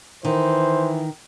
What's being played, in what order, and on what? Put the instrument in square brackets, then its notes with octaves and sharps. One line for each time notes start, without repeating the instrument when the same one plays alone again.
[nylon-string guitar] D#3 [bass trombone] E3 [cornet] C5